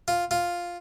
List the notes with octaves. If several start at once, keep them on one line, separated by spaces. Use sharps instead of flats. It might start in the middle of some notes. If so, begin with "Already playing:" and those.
F4
F4